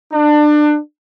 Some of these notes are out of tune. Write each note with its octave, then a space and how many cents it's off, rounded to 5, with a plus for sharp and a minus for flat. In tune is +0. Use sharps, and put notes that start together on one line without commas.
D4 +25